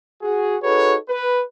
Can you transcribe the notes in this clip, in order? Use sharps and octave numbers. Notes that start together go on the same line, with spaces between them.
F#4 G#4
D#4 F#4 G#4 A4 B4 C#5
B4